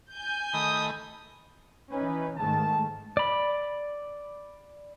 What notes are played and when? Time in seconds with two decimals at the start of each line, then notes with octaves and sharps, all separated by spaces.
0.12 G#5 G6
0.54 D#3 A3 B5 D#6
1.92 E3 C#4 D#4 B4
2.37 G#2 D#3 A3 A5
3.17 D5 B5